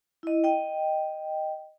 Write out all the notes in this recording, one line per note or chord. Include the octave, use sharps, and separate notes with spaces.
E4 D#5
D#5 G5